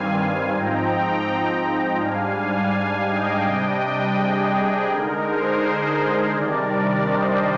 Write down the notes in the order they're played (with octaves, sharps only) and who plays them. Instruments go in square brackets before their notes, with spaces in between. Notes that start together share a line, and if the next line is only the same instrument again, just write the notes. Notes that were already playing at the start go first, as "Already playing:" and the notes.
Already playing: [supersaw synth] G2 D#3 G3 C4 F5 G#5
G#2 F3 C4 D#4 G5 A#5
G#2 G3 D4 F5 G#5
F5 G#5
D#5 G5
C3 G3 D4 D#5 G5
G#4
D3 G#3 D#4 A#4
G#4 C5
C3 D#3 G3 D4 A#4 D5
C5 D#5